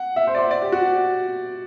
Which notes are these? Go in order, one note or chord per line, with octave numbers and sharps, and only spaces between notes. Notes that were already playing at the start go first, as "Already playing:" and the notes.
Already playing: F#5
E5
C5
D5
C5
D5
G4
F#4